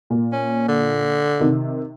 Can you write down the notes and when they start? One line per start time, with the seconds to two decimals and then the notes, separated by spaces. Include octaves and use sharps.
0.10 A#2
0.33 C#4
0.68 D3
1.40 C3 D#3